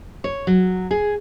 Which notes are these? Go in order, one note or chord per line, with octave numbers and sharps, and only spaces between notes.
C#5
F#3
G#4